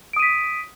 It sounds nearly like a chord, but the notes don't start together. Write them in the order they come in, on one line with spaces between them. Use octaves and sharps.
D7 D#6 D#7 B6